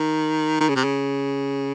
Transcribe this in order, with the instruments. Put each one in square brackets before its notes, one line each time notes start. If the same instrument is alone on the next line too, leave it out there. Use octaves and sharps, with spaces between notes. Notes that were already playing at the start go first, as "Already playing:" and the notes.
Already playing: [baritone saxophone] D#3
D#3
C#3
C3
C#3